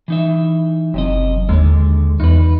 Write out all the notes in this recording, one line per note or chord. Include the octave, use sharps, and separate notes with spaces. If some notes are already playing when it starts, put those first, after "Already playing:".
E3 D#4 E5
F#1 F#2 C3 D#5
D#2 D3 G#3
E2 D#4 B4